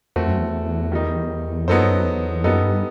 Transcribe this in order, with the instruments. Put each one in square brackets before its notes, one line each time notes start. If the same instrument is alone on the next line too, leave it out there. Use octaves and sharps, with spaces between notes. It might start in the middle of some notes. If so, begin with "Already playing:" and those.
[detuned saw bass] E2 [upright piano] A3 C4 F#4
[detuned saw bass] F#2
E2
[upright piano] D#3 G3 D#4
[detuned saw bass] F#2 [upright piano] F#3 B3 D#4 A4 C5
[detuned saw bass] G2
F#2
E2
[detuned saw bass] F#2 [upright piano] G3 B3 D#4 A4
[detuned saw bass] G2